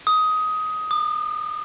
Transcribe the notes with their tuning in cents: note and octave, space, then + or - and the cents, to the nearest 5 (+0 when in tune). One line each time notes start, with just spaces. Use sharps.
D#6 +15
D#6 -40